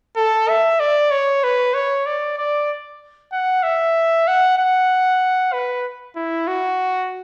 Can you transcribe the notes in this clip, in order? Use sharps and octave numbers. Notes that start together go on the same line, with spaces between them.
A4
E5
D5
C#5
B4
C#5
D5
D5
F#5
E5
F#5
F#5
B4
E4
F#4